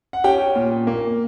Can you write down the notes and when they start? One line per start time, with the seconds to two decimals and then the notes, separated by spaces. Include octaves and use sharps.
0.13 F#5
0.24 C#4 G4 G5
0.56 A#2
0.87 A#3